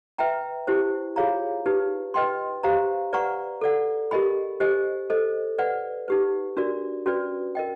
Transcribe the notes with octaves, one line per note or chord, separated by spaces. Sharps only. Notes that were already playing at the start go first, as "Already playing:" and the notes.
B4 E5 G5 A#5
E4 G4 C5
F4 G#4 C#5 F5 A#5
D#4 G4 B4
B4 D#5 G5 C6
G4 C5 F5 A#5
B4 D5 F#5 A#5 C#6
A4 D5 F#5
G4 A#4 D#5 G#5 B5
G4 C5 D#5 G#5
A4 C5 D#5
B4 D5 F#5
D#4 G4 B4
D4 F#4 A#4 D5
C#4 F#4 B4 D5
A#4 D#5 G5